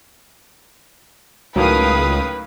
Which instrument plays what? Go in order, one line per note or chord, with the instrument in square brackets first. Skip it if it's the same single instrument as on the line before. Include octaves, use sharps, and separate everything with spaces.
[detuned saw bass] C#2 [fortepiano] A2 D#3 F#3 [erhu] B4 [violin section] F5 G5 D#6